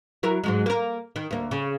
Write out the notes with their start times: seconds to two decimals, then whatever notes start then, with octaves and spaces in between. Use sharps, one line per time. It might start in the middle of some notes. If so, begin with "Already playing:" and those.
0.23 F#3 E4 A#4
0.44 G#2 F#3 G#3
0.66 A#3 A#4
1.16 D#3
1.31 D2 A#3
1.51 C#3